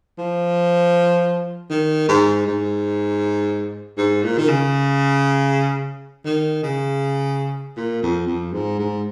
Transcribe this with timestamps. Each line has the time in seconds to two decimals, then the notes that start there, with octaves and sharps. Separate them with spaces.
0.18 F3
1.70 D#3
2.08 G#2
2.47 G#2
3.97 G#2
4.23 A#2
4.38 D#3
4.48 C#3
6.25 D#3
6.63 C#3
7.77 A#2
8.02 F2
8.27 F2
8.53 G#2
8.79 G#2